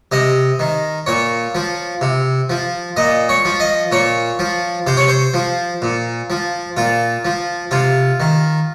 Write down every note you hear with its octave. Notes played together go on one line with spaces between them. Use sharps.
C3 D#5
D#3
A#2 C#5
F3
C3
F3
A#2 D#5
C#5
F3
D#5
A#2 C#5
F3
C3 C5
C#5
C5
F3
A#2
F3
A#2 F4
F3
C3 F4
D#3